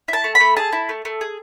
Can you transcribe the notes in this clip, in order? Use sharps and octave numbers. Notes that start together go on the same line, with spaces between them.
E4 A5
A3
B5
A3
G#4 A5
E4
A3
A3
G#4